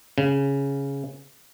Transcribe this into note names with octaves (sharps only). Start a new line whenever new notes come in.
C#3